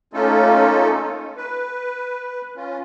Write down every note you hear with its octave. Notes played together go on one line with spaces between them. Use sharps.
A3 A#3 C#4 D#4 F4 A4
B4
C#4 F4